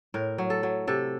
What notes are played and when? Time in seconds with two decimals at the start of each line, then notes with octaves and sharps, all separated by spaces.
0.14 A2 A#4
0.38 F#3
0.50 A4
0.63 F#3
0.87 C3 A4